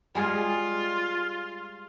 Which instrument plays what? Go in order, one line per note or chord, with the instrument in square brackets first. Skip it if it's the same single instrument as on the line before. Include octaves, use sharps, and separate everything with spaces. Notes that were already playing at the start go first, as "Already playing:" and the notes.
[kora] G3 G#3 G#4 [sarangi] F4